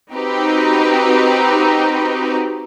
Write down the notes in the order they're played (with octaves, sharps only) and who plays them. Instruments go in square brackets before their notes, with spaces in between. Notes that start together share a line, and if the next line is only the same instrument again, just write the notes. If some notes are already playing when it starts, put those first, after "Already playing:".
[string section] C4 D#4 F#4 G4 B4